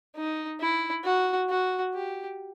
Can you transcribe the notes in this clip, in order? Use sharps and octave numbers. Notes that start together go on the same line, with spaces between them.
D#4
E4
F#4
F#4
G4